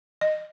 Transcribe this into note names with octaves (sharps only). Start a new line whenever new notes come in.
D#5